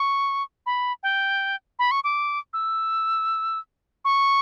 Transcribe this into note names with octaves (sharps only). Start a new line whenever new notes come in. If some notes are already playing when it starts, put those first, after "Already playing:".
Already playing: C#6
B5
G5
B5
C#6
D6
E6
C#6